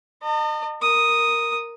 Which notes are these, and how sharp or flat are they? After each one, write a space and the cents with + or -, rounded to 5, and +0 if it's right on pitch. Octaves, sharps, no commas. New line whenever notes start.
D#5 -30 A5 +45
A#4 +0 D#6 +0